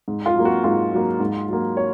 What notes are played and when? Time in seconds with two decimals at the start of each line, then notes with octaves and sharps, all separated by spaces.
0.08 G#2
0.26 F4
0.35 F#3 A#3
0.45 F#4
0.64 G#2 F4
0.92 F#3 A#3
1.20 G#2
1.48 F#3 A#3
1.77 C#5